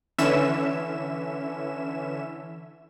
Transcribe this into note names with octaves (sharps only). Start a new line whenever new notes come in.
D3 E3 C#4 E5 E7